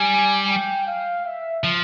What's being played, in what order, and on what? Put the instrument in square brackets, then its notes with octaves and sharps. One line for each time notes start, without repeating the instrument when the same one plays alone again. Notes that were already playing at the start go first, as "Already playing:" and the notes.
Already playing: [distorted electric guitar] G3 [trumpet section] G#5
[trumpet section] G5
F5
E5
[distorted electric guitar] F3